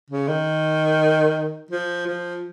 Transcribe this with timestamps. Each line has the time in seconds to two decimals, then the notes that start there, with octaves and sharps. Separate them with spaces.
0.10 C#3
0.28 D#3
1.71 F3
2.07 F3